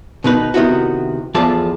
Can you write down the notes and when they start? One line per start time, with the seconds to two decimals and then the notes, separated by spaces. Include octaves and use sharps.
0.24 B2 D#3 D#4 B4
0.54 C3 D#3 B3 E4 F#4
1.35 E2 F3 F4 A4 D5 A5